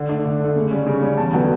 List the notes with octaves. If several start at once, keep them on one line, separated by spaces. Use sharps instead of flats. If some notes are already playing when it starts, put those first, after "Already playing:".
Already playing: D3
A3 D4
D3
A3 D4
C#3
G3 C#4
C#3
G3 C#4
E2 A5
D3 F#3 B3 G5